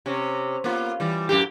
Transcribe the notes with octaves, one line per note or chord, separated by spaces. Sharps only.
C3 C#4
A#3 B3 F4
E3 G3
F#2 A2 G4